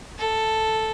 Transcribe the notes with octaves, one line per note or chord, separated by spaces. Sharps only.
A4